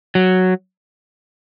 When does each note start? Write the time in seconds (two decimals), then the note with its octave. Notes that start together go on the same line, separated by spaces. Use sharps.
0.15 F#3